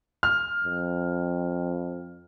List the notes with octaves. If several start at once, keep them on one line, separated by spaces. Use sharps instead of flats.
F6
F2